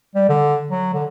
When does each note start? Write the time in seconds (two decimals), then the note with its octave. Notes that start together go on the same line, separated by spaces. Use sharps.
0.15 G3
0.29 D3
0.71 F#3
0.94 D3